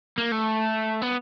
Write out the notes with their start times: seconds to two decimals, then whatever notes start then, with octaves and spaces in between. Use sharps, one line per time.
0.18 A#3
0.32 A3
1.02 B3